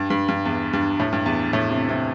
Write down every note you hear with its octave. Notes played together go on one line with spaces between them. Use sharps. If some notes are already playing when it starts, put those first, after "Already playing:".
Already playing: G2
G2
G2
E2
G2
A2
G2
E2
A2
C3
C3